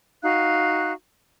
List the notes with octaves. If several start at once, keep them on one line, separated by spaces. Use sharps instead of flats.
D#4 F#4 F5 F#6